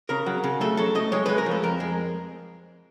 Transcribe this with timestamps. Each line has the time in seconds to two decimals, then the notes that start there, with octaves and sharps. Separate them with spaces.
0.09 C#3 A#4
0.26 F#3
0.44 C#3
0.61 A3 A4
0.77 F#3 A4
0.95 A3 D#5
1.12 G#3 C#5
1.26 G#3 B4
1.38 A#4
1.46 F3
1.51 A4
1.63 F2 A#4
1.80 G#3